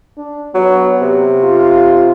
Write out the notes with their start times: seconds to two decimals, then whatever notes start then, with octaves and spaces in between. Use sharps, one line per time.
0.17 D4
0.54 F#3 B3
1.01 C3
1.44 F4